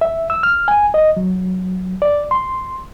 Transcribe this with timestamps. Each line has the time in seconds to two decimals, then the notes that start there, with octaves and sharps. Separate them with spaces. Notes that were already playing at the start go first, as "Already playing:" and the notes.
0.01 E5
0.30 E6
0.43 F6
0.68 G#5
0.94 D#5
1.17 F#3
2.02 D5
2.31 C6